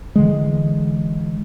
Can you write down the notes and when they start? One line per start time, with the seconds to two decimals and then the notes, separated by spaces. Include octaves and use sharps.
0.16 D3 E3 G#3